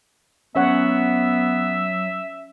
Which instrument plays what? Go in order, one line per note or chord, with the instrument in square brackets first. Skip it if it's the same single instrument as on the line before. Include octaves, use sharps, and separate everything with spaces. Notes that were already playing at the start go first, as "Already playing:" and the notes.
[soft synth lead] F#3 [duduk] B3 [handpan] C#4 C#5 F#5 [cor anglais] E5